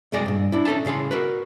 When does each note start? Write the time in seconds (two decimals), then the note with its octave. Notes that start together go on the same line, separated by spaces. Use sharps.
0.12 C2 F#2 G#3 G#4 D5 D#5
0.26 G2 A#2
0.52 D4 E4
0.65 C#4 D#4 A4 E5 A5
0.85 A2 C#3 G#4 F5 C6
1.11 F#4 A#4 B4